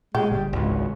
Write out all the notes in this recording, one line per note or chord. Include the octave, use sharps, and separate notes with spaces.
A#2 G#3 G4
G1 G3
G#1 C#2 F#4